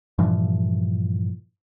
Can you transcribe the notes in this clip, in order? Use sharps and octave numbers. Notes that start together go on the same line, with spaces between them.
G2 A#2 E3 F3